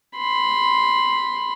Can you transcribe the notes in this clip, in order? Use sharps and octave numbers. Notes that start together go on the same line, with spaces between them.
B5 C6